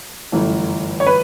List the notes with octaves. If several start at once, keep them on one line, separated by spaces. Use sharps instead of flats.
G1 F#2 E3 A3
C#5
B4